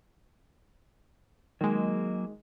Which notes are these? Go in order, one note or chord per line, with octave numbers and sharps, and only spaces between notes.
D#3 F#3 G#3 A#3